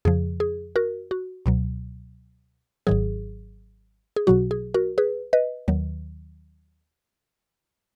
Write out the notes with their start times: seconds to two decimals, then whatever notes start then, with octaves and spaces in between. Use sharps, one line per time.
0.05 F2 C#3 F3 G#4
0.40 G#4
0.76 F#4 A#4
1.11 F#4
1.46 C#2 B2 F#3
2.87 G#1 G#2 D#3 F#3 G#4
4.16 G#4
4.27 B1 B2 F#3 F#4
4.51 G#4
4.74 F#4 A#4
4.98 G#4 B4
5.33 B4 D#5
5.68 D#2 D#3 F#3